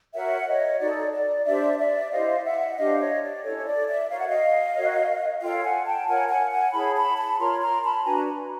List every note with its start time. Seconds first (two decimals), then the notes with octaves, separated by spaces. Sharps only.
0.14 F#4 A#4 C#5 E5 F#5
0.46 C#5 D#5
0.80 D#4 F#4 A4 D5
1.13 D5
1.46 D4 G4 C5 D5 E5
1.78 D5 E5
2.11 E4 G4 C5 D#5 F5
2.44 E5 F#5
2.72 F#5
2.77 D4 G4 C5 D#5 F5
2.99 C#5 D#5
3.21 D5
3.43 C#4 E4 A4 C#5
3.57 C#5
3.66 D5
3.87 D5 E5
4.09 F#4 A#4 C#5 F5
4.18 F#5
4.27 D#5 F5
4.75 F#4 A#4 C#5
5.41 F4 A4 C#5 F5 G5
5.63 F#5 G#5
5.85 G5 A5
6.07 F4 A#4 C#5 F#5 G#5
6.28 F#5 G#5
6.50 F#5 G#5
6.73 E4 G#4 C#5 A5 B5
6.95 A5 B5
7.17 A5 B5
7.38 F4 A#4 C#5 A#5 C6
7.61 A#5 C6
7.83 A5 B5
8.04 D4 F#4 B4 G#5 A#5